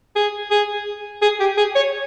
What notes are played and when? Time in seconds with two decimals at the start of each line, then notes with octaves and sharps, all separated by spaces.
0.16 G#4
0.51 G#4
1.22 G#4
1.40 G4
1.57 G#4
1.75 C#5